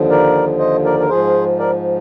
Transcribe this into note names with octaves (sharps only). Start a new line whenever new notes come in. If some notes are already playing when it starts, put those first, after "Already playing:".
Already playing: D#2 D3 F3
A#4 D5
C5 D#5
A#4 D5
A#4
G#2 F3 G#4 C5
A#4 D5